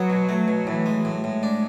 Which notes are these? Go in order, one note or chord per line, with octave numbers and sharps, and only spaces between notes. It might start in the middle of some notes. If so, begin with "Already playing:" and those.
Already playing: F#3 B3
B2
A3
B2
A2 E3
G#3
F#3
A2
A2 G#3
D4